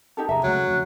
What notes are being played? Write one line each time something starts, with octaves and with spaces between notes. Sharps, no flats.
D#4 G4 A4
F1 G#4 E5 A#5
C#2 C#3 F#3 A3 F#6
F2 C#3